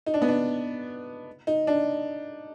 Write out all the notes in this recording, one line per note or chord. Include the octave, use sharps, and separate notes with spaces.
D#4
D4
B3
D4
D#4
D4